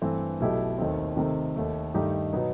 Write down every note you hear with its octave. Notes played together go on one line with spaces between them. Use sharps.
G2 E3 A3 C4
B1 B2 A3 E4 G4
D#2 D#3 A3 C4
C3 D#3 A3 C4
D#2 D#3 A3
G2 D#3 A3 D#4 G4
B2 F#3 B3 D#4